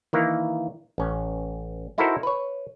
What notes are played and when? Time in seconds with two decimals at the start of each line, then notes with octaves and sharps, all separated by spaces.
0.13 D#3 E3 A#3
0.98 A1 C#4
1.98 D#4 E4 F#4 A4 A#4 C5
2.23 B4 C#5